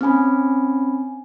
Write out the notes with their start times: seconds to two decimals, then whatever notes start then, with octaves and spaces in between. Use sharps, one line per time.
0.01 C4 C#4 G#5 B5